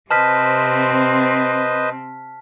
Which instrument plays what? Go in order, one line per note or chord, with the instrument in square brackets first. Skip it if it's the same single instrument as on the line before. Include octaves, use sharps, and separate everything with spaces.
[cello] C3 C4 [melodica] B4 C5 D#5 [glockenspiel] A5 F6 B6